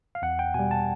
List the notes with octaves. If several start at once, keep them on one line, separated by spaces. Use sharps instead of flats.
F5
E2 F#5
G5
B2 G3 G#5
A5